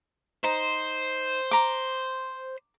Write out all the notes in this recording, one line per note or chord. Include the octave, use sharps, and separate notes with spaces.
D#4 C5
A#5 D6